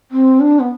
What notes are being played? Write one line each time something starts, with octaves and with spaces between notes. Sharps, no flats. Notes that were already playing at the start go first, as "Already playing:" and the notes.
C4
D4
B3